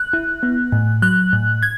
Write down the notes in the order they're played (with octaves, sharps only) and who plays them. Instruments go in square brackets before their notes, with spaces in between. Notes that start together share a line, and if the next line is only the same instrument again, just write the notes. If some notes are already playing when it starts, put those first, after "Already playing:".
Already playing: [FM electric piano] F#6
E4
B3
A2
F#3 F#6
A2
G#6